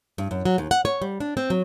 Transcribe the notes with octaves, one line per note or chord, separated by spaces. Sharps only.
G2
F#2
F#3
D#2
F#5
C#5
G3
D4
C4
F#3